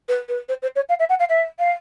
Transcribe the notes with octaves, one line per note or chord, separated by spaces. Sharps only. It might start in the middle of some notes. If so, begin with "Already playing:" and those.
B4
B4
C5
C5
C#5
F5
E5
F#5
F5
E5
F5